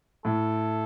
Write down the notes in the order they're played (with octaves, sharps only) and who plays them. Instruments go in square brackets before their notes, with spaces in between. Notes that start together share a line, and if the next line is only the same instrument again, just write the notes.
[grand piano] A2 [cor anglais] A4